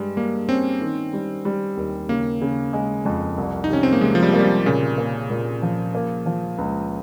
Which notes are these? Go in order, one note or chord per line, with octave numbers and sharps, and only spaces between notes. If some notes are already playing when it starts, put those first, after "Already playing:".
Already playing: G2 G3 G#3
G3 A#3
C4 C#4
D#3
G3
G3
D#2
C#3 A#3
C#3
G#3
F2
C2
D#4
C3 C#4
C4
A#3
C3 G#3
F3
G3
A#3
G3
F3
A#2 C#3
A#3
A#2
F3
A#3
F3
C#2